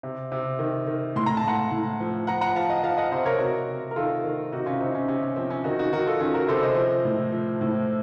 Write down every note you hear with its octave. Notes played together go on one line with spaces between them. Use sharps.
C3
C3
D#3
D#3
A2 C6
A#5
A5
A2 F#5 A#5
A2
F3
F3 F#5 A#5
F#5 A#5
F3 F5 A5
D#5 F#5
F3 F5 A5
D#5 F#5
C3 C5 D#5
A#4 C#5
C3 F#4 A#4
C3
A#4
D#3 F4 A4
D#3
C3 D#4 F#4
C#4 F4
C3 C4 D#4
C#4
C3 C#4
C#4
F3 C4
C#4
D#3 D#4 F#4
D#4 F#4
D#3 F#4 A#4
F4 A4
D#3 C#4 F4
F#4 A#4
C3 A4 C5
C5 D#5
F3
A2
F3
A2